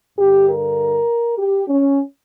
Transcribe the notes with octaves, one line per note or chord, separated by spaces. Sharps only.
G2 D3 G4
A#4
G4
C#4